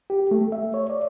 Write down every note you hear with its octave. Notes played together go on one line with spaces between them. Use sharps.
G4
A3
E5
C#5
D5